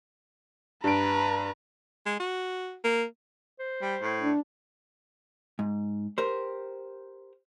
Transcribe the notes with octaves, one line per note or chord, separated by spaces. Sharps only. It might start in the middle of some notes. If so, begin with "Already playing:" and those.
G2 B4 A#5 D7
G#3
F#4
A#3
C5
G3
A2
D4
G#2
G4 A#4 C5